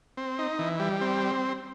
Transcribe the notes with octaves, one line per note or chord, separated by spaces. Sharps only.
C4
D#4
E3
G3
C4